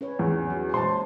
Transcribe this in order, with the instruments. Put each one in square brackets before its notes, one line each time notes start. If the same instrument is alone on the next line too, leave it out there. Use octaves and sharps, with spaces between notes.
[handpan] C#4 B4 C#5
[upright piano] E2
[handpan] F#3
[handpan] A#2 G#3 C5 [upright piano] A5 C6